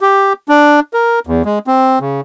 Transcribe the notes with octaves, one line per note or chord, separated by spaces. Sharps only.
G4
D4
A#4
E2
G#3
C4
C#3